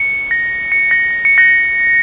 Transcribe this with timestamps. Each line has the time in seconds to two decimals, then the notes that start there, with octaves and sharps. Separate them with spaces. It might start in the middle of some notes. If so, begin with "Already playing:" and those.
Already playing: C#7
0.31 A#6
0.72 C#7
0.91 A#6
1.11 A#6
1.25 C#7
1.38 A#6